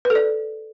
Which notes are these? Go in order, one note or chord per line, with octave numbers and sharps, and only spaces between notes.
B4
A4
D5